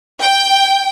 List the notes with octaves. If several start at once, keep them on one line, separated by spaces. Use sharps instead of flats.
G5